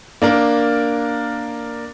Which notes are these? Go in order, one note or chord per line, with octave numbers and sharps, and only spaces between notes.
A#3 D4 A#4